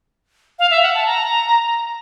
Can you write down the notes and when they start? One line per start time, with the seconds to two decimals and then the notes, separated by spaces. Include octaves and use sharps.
0.59 F5
0.71 E5
0.83 F#5
0.95 A5
1.07 A#5